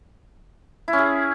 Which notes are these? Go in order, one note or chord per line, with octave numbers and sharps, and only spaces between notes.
E4
C#4
G#4